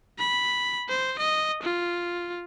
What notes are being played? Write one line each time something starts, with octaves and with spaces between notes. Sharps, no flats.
B5
C5
D#5
F4